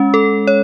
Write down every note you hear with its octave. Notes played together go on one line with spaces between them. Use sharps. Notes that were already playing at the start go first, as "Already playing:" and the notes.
Already playing: G#3 C#4
A4
C#5